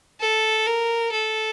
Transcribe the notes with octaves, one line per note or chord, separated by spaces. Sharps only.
A4
A#4
A4